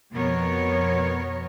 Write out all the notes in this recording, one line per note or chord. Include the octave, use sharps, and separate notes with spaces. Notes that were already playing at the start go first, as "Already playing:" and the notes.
F2 B2 B3 A#4 C#5